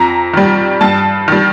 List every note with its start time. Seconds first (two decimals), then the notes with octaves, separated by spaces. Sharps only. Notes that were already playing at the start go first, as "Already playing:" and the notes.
Already playing: F2 A#5
0.33 D#3 G3
0.81 G2 A5
1.28 D#3 G3